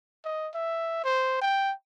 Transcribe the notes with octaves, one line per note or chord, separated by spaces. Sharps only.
D#5
E5
C5
G5